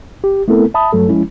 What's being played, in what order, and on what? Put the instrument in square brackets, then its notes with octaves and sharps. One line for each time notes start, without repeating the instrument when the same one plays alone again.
[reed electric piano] G4
A3 B3 C4 E4 A4 A#4
E5 A5 B5 D#6
G2 F#3 A3 A4
F3 G#3 C#4 E4